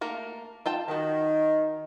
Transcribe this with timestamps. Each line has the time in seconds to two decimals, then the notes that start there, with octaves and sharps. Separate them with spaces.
0.01 A3 A#3 A#4
0.66 F4 G5 A5
0.88 D#3 F#4 A5